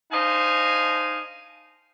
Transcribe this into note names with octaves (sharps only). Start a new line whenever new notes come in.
D4 D#4 C5 D#5 F5 G#5